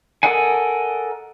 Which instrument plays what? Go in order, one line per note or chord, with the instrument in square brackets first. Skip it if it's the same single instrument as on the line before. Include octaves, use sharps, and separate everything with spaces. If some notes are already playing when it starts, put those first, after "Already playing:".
[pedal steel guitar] A4 A#4 D#5 F#5 G#5